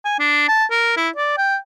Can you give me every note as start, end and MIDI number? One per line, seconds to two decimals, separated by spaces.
0.05 0.16 80
0.19 0.45 62
0.48 0.65 81
0.71 0.96 70
0.97 1.09 64
1.16 1.34 74
1.38 1.57 79